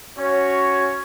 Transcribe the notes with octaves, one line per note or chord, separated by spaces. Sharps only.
C#4 F#4 C#5